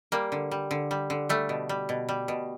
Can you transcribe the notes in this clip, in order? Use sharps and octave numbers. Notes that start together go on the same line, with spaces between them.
G3 A#3
D3
G3
D3
G3
D3
G3 A3
B2
G3
B2
G3
B2